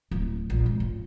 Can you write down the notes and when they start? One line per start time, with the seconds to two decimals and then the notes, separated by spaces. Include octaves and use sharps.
0.11 D1
0.50 A#1
0.66 G#1
0.80 C#2